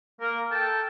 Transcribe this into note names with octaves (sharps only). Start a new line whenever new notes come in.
A#3 A#4
A4 G5 A5